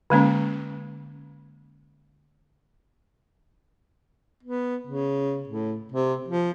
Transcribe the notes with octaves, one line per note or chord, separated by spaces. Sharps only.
D3 G#3 A#3 C#4
B3
C#3
A2
C3
F3